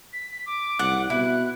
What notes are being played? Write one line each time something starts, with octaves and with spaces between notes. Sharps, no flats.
B6
D6
C2 F#5
B2 E4 F#6